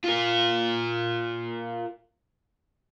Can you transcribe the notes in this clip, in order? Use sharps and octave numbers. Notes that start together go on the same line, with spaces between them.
F4 A#4